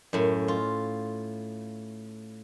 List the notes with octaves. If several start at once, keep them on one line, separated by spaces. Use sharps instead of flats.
F#2 A2
F4